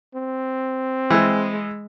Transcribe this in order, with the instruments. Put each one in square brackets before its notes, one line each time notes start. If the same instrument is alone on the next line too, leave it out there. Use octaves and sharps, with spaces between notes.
[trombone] C4
[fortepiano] E3 [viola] G#3